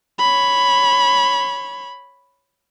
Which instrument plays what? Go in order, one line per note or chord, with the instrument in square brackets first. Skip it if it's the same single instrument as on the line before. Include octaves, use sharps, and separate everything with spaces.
[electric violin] C#5 B5